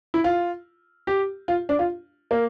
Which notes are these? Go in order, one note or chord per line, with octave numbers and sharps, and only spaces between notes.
E4
F4
G4
F4
D4
F4
A#3